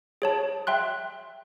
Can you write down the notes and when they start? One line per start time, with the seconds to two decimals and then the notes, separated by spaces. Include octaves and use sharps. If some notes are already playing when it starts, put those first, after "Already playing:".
0.22 G#4 C#5 A5
0.67 E5 G5 C6 F#6